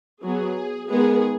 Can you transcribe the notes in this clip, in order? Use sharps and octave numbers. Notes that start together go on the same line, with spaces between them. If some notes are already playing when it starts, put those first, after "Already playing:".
F#3 B3 G#4
D#3 G#3 B3 G#4